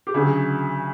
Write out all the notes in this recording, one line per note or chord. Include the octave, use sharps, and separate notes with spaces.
G4
D2 C#3 F#3 G#4